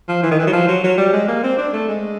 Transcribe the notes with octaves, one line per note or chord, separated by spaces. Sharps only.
F3
E3
D#3
E3
F#3
F3
F#3
F#3
G3
G#3
A#3
C4
D4
A3
G#3